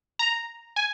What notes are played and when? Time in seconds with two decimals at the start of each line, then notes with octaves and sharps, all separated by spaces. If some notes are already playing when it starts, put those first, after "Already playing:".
0.19 A#5
0.76 G#5